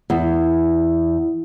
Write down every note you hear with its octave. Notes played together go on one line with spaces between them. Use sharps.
E2